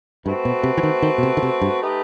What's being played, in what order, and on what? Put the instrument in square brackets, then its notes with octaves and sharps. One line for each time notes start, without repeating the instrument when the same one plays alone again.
[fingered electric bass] G2 [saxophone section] A3 C4 F#4 B4
[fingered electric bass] B2
C3
E3
D#3
D#3
B2
C3
D#3
C3
G2
[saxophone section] A3 D#4 G4 B4